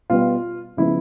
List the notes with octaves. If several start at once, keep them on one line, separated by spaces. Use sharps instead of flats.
B2 G3 B3 F4
C#3 F3 G#3 B3 E4